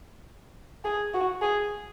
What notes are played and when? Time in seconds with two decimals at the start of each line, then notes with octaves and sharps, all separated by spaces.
0.84 G#4
1.14 F#4
1.42 G#4